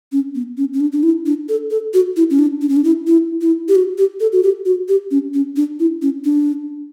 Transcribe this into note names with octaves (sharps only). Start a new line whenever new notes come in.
C#4
B3
C#4
C#4
D4
D4
E4
D4
A4
A4
F#4
E4
C#4
D4
D4
C#4
D4
E4
E4
E4
G4
F#4
G4
A4
F#4
G4
F#4
G4
C#4
C#4
D4
E4
C#4
D4